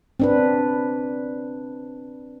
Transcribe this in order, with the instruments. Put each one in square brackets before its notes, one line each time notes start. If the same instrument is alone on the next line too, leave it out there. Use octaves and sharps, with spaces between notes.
[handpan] C4 D4 B4